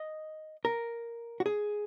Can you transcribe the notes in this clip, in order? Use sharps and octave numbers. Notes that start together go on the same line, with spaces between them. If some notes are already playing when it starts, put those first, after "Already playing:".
Already playing: D#5
A#4
F#4
G#4